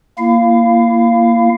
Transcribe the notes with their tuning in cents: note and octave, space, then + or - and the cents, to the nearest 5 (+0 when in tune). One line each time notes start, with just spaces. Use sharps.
A#3 +0 E4 +30 F5 -5